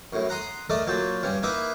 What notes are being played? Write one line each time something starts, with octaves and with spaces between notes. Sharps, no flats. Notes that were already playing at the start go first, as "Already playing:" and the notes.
F#2 A2
F#5 A#5 C6 D#6
A3 A4 A#4 D5 D#5
A#2 F#3 G5 A5
G2 G3 C#4
A#3 B3 D#4 E4 B4 E5